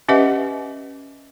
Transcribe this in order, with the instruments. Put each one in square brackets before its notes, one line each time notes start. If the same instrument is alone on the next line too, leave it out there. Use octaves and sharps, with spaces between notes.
[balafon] C#4 G4 B4 D#5 E5 F#5